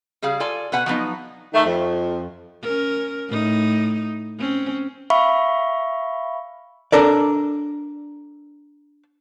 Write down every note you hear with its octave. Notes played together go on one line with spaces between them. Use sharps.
C#3 G3 G#4 F5
F4 A4 D5 G#5
B2 B4 F#5 G#5
F3 F#3 B3 D#4
D#3 A3
F2
C#4 A#4
A2 D#4
C4 C#4
E5 F5 B5 C#6
D4 A4 A#4 D5